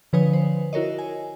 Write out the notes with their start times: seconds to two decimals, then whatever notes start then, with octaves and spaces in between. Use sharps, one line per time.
0.13 D3 F3 B4 C#5 G#5 D#6
0.33 C5
0.73 E4 F#4 A#4 C#5 D#5
0.99 G#5